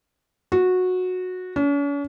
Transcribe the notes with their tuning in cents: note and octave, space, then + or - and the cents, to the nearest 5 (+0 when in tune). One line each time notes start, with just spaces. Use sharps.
F#4 -15
C#4 +45